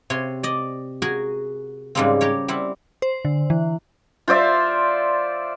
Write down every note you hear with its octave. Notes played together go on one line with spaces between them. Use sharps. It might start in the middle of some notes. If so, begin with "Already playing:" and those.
C3 C#5 C6
D5 D#5
F#4 G#4 A#4 F#5 G#5
G#2 C#3 G3 G#3 A#3 C4
G4 A#4 C#5
G3 C4 E4 F#5
C5
D3
E3
F4 C5 D5 E5